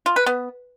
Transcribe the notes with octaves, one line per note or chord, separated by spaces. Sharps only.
F4
B4
B3